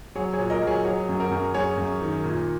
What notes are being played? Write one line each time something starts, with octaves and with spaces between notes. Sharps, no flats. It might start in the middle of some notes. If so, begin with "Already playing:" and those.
F#3 G#4 C#5
G#4 C#5
A#2
A#4 D#5
F#3
G#4 C#5
F#3 G#4 C#5
F#2
F#4 A#4
F#2
F#2 G#4 C#5
F#2
D#3
A#2